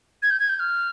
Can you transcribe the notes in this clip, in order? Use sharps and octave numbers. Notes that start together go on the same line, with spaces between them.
G#6
G6
G#6
G6
F6